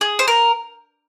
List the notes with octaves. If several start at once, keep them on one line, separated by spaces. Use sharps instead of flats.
G#4
C5
A#4